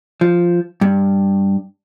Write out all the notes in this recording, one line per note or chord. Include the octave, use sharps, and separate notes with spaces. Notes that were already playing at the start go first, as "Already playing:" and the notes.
F3
G2